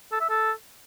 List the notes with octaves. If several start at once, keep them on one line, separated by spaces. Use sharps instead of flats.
A4
E5
A4